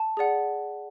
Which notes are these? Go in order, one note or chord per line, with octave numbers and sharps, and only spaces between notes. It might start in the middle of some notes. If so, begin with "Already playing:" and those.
Already playing: A5
G#4 D5 F#5